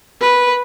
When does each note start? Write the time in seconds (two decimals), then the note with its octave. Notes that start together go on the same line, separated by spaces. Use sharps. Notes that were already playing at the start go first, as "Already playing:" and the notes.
0.21 B4